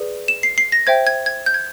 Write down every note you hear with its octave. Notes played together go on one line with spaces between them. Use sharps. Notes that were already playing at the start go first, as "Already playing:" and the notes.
Already playing: G#4 B4 D5
E7
C7
C7
A#6
C5 E5 G5 G#6
G#6
G#6
G6
G#6